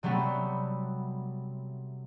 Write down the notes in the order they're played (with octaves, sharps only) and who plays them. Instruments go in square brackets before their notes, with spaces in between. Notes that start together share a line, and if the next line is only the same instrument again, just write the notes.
[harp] C3 F#3 G3 A3 B3 C4